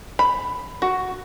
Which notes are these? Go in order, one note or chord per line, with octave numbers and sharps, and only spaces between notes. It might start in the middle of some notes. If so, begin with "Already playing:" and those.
B5
F#4